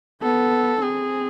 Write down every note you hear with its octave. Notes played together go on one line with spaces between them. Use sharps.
B3 A4
C4 G#4